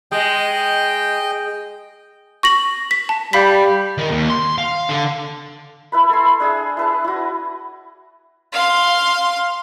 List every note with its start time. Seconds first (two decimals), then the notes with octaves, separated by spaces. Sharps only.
0.12 G#3 D#5 G5
2.43 C#6 A#6 F#7
2.91 B6
3.09 A5
3.33 G3 F5 B5 B6
3.98 D#3
4.11 D#2
4.30 C6
4.58 F5
4.89 D3
5.92 E4 B4 B5
6.09 A4 G#5 C6
6.40 D4 G#4 E5
6.77 E4 B4 A5
7.04 E4 F#4
8.53 F5 C6